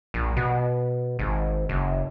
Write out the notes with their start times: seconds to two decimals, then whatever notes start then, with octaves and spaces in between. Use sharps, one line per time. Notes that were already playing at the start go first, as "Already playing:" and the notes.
0.14 A#1
0.37 B2
1.19 G#1
1.69 F#1